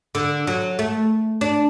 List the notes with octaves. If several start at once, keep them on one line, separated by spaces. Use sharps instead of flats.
D3
F#3
A3
D4